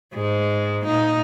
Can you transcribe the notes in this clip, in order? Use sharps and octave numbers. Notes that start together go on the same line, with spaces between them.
G#2 G#3
A#2 D#4